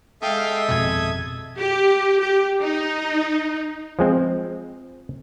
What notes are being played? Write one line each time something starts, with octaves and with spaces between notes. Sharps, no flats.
G#3 A4 E5 F5 G5 D#6
G#1 F2 B2 G#6
G4
G4
D#4
F3 G#3 C4